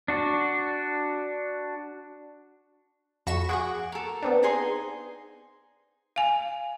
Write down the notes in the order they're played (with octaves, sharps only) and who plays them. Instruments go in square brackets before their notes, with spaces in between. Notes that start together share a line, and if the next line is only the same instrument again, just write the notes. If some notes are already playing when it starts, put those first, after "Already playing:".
[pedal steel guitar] D4 F#4
[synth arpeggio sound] F2 C#6 E7 [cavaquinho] F#4 B5
[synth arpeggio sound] F#4 G#4 [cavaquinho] F#5 C#6 D6
[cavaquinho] A4 A#4
[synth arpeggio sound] B3 C4 D4
[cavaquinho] D#4 G#4 C6
[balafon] F5 G#5